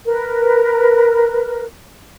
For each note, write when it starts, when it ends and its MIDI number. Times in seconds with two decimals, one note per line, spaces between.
0.06 1.64 70
0.06 1.64 71